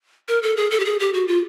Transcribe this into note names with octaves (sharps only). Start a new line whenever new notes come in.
A#4
A4
G#4
A4
G4
G#4
G4
F#4
F4